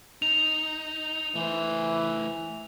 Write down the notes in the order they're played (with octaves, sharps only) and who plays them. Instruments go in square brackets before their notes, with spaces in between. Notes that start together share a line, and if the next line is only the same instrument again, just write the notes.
[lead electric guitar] D#4 [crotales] F7
[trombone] E3 [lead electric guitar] A3 C5